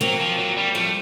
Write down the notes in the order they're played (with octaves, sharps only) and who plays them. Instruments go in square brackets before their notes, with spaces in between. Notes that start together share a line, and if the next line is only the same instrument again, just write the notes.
[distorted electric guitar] F#3 [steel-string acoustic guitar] A#3 C4
[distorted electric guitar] F3
F#3
G3
[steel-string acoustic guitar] F3 G3 [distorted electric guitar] A3